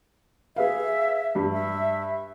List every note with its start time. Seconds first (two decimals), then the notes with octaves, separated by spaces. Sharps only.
0.56 G#4 B4 E5 F5
1.35 G2
1.53 E5